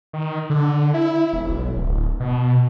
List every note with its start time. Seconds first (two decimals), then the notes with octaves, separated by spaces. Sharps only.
0.13 D#3
0.50 D3
0.94 E4
1.33 E1
1.49 B1
1.77 D1
2.20 B2